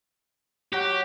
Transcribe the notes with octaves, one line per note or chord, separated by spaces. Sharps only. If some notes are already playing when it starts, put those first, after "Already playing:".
F#3 F#4 G4